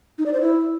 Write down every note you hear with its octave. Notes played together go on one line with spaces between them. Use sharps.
D#4
D5
C5
E4